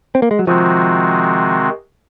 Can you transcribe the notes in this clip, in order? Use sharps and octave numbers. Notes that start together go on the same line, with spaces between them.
C4
A#3
G#3
F#3
C3 D#3 F3 G#3 C4 F#4